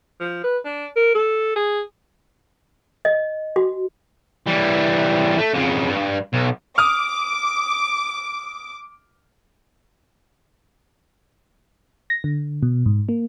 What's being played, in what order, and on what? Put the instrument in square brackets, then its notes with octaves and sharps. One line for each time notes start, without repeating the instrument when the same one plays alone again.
[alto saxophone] F3
B4
D4
A#4
A4
G#4
[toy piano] D#5
F#4
[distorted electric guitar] E3 G3
A3
F2 C#3
G2
B1
[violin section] D6 [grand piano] D#6 F6
[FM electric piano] A#6
D3
B2
G#2
A#3